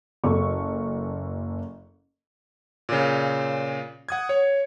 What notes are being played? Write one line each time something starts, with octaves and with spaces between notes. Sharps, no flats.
F#1 A4 C#6
A#2 C#3
F#5 D#6 G#6
C#5